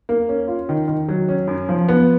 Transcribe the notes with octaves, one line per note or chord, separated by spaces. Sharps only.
A#3
C#4
F4
D#3
D#3
F#3
C#4
F#2
F3
B3